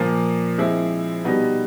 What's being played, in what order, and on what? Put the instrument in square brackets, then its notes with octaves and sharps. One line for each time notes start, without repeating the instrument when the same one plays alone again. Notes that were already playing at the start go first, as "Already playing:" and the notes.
Already playing: [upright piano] A#2 F3 A#3
F3 G#3 C4 E4
B2 G3 B3 D#4